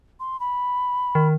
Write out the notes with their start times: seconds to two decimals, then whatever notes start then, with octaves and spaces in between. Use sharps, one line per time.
0.20 C6
0.40 B5
1.15 D#3